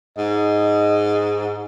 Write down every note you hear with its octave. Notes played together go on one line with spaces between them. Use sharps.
G#2 D#5